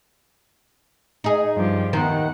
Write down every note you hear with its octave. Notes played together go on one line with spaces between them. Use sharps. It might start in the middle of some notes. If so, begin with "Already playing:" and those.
D#4 G#4
G2 F3 G4
D#2 D#3 B3 C5 F#5